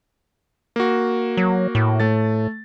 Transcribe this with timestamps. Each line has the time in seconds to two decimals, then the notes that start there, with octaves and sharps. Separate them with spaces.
0.76 A#3 F#4
1.37 F#3
1.75 A2
2.00 A3 A6